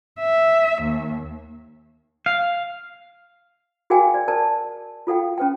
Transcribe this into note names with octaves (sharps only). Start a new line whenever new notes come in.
E5
D#2
F5
F#4 G#4 A#4 F5 G5 G#5
D5
A#4 D5 A5
F4 A4 F5 G5
C#4 B4 G5